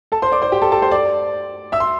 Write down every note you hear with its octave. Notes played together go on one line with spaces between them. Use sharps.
A4 A5
C5 C6
D5 D6
C5 C6
G4 G5
A4 A5
A4 A5
C5 C6
D5 D6
E5 E6
C6